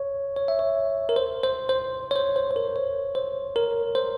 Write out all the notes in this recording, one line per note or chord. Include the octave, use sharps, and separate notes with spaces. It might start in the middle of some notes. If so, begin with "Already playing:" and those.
Already playing: C#5
C#5
E5
C#5
A#4
C5
C5
C5
C#5
C5
C5
C5
A#4
C#5
C5
A#4
C5